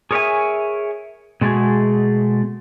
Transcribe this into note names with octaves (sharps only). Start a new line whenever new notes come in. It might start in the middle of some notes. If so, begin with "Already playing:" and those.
G#4 A#4 C#5 D5 E5 G#5
B2 G#3 A3 F4 F#4 G#4